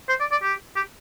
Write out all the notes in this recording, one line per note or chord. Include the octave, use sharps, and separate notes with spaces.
C5
D5
D5
G4
G4